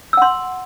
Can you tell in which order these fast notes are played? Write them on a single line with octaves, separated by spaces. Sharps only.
E6 F#5 C6